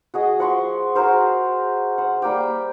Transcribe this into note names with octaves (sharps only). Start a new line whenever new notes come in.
F#4 G#4 D#5
F3 F#5 C6 C#6
F#4 G#4 A#4 C5
C5 F#5
G3 A#3 G4